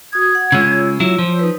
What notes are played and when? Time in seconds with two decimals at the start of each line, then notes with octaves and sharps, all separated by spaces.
0.13 F#4 D#6 G#6
0.35 F#5
0.52 C#3 G#3 F4 C#5 E6
1.00 F#3 E4
1.19 F3 C5
1.39 D#4 B4